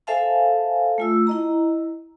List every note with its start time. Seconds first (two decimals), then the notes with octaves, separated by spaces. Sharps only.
0.07 A4 C5 E5 F5 G#5 A5
0.98 A3 F4 E6
1.27 E4 D#5 A#5